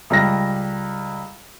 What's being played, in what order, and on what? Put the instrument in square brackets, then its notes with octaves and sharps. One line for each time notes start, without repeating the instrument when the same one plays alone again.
[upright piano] C#2 G3 A#6